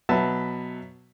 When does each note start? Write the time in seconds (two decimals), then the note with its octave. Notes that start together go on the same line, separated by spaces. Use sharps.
0.09 B2 F#3 B4 E5 A5